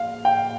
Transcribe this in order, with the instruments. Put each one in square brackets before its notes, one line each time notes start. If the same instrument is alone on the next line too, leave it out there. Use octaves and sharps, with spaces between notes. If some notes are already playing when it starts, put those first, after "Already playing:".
Already playing: [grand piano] F5
G5